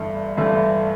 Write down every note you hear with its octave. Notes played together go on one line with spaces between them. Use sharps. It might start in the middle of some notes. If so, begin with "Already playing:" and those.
Already playing: G1 G2 E3 A3
G1 G2 E3 A3